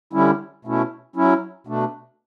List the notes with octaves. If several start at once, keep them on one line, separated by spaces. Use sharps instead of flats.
D3 G3 C#4 E4
B2 A3 C#4 E4
F#3 C#4 E4
B2 A3 D4